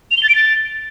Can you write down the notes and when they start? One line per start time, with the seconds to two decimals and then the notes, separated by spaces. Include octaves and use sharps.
0.11 F7
0.17 G7
0.23 A6
0.29 D7
0.35 A6